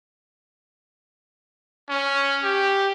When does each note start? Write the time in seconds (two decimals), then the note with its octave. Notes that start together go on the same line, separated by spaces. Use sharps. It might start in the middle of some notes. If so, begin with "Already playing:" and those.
1.89 C#4
2.44 G4